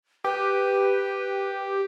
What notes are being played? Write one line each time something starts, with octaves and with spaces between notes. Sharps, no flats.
G4 B4